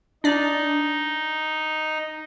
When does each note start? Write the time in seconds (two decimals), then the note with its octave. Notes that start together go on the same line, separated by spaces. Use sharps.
0.24 D4 D#4 D5